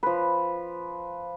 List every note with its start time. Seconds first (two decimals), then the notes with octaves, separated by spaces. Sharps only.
0.03 F3 B4